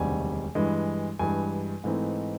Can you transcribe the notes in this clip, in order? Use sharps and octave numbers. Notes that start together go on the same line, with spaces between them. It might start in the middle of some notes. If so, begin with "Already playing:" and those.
Already playing: E1 D2 C3 D#3 G3 G#5
G2 E3 G#3
G2 E3 G#3 G#5
G#2 E3 A3 C4 D#4